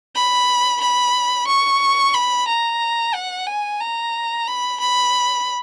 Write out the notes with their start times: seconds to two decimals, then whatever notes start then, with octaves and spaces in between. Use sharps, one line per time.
0.15 B5
0.81 B5
1.47 C#6
2.14 B5
2.48 A#5
3.14 F#5
3.47 G#5
3.80 A#5
4.47 B5
4.80 B5